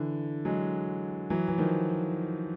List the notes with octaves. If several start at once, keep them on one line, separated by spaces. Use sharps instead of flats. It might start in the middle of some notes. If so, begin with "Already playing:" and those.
Already playing: D3 E3
F#3 G#3
E3 F#3
E3
D#3 F3